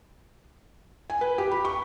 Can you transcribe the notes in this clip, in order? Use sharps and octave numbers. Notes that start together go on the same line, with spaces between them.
G#5
B4
G4
B5
C#6